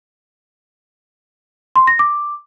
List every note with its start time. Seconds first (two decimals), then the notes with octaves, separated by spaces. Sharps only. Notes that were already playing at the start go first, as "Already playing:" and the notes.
1.76 C6
1.87 A#6
1.99 D6